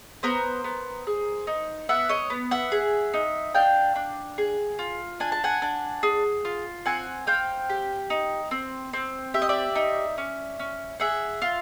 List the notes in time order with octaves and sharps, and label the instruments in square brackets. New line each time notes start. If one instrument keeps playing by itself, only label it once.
[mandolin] B3 A#4 C5
B3
G#4
D#4
B3 E5 F#5
C#5 D#5
B3
E5 F#5
G#4
D#4
D4 F5 G5
D4
G#4
F4
D4 G#5
A5
F#5 G#5
D4
G#4
F4
C4 F#5 G#5
C4 F5 G5
G4
D#4
C4
C4
G4 E5
D#5
D5 E5
D#4
C#4
C#4
G#4 E5 F#5
F4